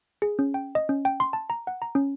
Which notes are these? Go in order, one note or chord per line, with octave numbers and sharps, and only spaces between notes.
G#4
C#4
G5
D#5
C#4
G5
C6
A5
A#5
F#5
A#5
C#4